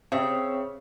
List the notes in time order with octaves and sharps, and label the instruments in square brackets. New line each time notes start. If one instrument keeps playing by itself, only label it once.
[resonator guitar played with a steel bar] C#3 [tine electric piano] C4 [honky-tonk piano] G4 C#5 E5